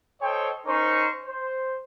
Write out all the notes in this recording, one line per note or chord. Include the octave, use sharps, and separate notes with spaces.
A4 C5 C#5 D#5 G5
C#4 D#4 A#4 C5 C#6
C5